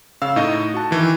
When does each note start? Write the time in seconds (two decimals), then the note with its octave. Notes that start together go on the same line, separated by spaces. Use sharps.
0.22 C#3 F5 E6
0.36 A2 D#4 D#5
0.74 F#4 A5
0.91 D#3 E3